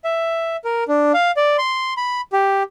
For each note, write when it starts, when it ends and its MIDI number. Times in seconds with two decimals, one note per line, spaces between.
0.04 0.56 76
0.64 0.84 70
0.88 1.12 62
1.14 1.31 77
1.37 1.57 74
1.58 1.94 84
1.97 2.21 83
2.33 2.63 67